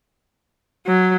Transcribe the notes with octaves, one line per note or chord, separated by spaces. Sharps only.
F#3